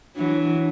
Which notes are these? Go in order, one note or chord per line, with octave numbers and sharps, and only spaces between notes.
E3 F#3 D4